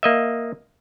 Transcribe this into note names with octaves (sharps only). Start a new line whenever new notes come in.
A#3 D#5 E5